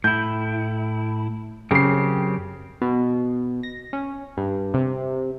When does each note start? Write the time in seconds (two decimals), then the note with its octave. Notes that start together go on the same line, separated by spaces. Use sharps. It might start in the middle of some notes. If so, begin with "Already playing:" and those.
0.04 A2 E4 G6
1.71 F#2 C#3 C4 G4 C7
2.82 B2
3.63 A#6
3.93 C#4
4.37 G2
4.74 C3